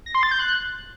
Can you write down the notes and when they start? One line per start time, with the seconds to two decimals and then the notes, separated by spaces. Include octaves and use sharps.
0.06 A#6
0.15 C6
0.23 A6
0.31 G6
0.40 F#6